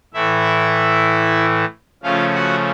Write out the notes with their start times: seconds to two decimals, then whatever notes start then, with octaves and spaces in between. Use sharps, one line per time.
0.14 A2 E3 A3 E4 E5
2.03 C#3 F3 A3 C#4 F4 F5
2.34 F#4 F#5